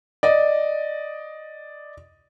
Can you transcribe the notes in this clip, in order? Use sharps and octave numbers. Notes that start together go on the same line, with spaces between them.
D5 D#5